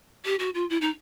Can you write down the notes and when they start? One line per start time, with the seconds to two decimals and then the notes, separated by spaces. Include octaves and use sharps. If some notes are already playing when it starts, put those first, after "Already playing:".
0.25 G4
0.39 F#4
0.54 F4
0.70 E4
0.81 D#4